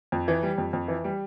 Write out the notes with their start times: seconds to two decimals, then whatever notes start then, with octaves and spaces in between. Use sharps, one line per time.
0.12 F2
0.28 E3
0.43 G3
0.58 F2
0.73 F2
0.88 E3
1.04 G3